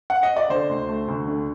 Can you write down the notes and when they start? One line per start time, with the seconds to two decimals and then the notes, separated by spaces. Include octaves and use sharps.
0.10 F#5
0.23 D#5
0.37 D5
0.50 D3 C5
0.69 D2
0.89 A3
1.08 D2
1.28 D3